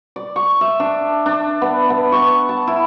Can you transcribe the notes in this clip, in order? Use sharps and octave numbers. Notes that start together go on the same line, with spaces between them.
D5
C#6
E5
D4
D4
B3
B3
C#6
A5
E4